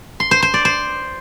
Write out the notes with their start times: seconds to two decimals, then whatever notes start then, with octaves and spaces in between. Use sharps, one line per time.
0.20 C6
0.31 C5
0.42 C5
0.54 D5
0.65 C5